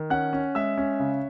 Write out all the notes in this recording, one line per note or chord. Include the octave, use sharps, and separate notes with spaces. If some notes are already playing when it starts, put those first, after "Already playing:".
Already playing: D#3
C#4 F#5 F#6
C#4
G#3 E5 E6
C#4
C#3